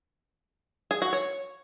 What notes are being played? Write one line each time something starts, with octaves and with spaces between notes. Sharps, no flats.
G#4
F#4
C#5